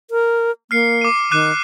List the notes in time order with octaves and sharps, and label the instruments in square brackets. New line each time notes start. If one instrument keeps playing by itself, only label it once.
[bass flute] A#4
[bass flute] A#3 [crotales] F6 C7 C#7
[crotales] D6 D#7
[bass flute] D#3 [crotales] D6 F#6 D#7